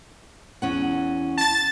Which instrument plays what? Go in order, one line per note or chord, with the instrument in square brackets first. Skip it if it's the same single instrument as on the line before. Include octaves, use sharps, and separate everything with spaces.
[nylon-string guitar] E2 C#4 F#5
[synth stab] A5 A6